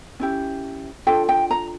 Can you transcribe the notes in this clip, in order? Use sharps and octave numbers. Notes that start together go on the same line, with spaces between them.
C#4 E4 G4
D4 F4 A4 G5
G5
A#5